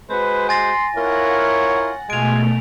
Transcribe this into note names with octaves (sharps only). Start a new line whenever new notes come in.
G#3 F#4 B4 C5
G#5 C6 A6 A#6
E4 F4 A#4 C#5 F#5
B2 G#3 A3 F4 G#5 D7 F7